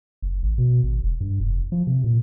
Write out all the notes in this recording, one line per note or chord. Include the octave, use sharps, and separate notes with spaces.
F#1
G#1
B2
G#1
E1
G2
F1
F3
C3
A#2